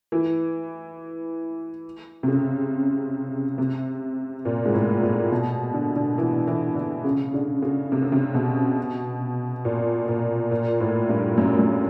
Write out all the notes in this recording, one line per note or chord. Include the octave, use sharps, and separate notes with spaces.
E3
C3
C#3
C3
A#2
G#2
A2
A#2
B2
D3
D3
E3
E3
D3
C#3
D3
C#3
C3
C#3
C3
B2
A#2
A#2
A#2
A2
G2
F#2
F#2